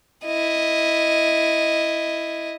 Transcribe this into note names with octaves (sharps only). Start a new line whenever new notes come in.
E4 D#5